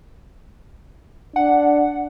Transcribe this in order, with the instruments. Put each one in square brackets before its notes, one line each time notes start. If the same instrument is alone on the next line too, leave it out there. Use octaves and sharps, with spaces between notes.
[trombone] D4 [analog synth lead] F#5